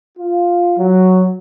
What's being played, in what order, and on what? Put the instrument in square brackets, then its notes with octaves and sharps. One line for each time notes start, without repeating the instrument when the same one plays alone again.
[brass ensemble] F4
F#3